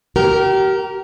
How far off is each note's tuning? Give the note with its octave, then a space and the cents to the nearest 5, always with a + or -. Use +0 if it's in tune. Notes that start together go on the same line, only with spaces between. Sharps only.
G4 -35 A#4 +0